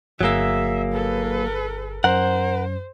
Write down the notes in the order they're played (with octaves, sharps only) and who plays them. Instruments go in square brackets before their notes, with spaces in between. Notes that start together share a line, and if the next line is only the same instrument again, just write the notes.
[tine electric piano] G1 G#4 E6 [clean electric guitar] F#3 A#3 [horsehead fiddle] E5
[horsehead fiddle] A4 B4
[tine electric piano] F#2 [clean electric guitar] A#4 F#5 [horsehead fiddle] C5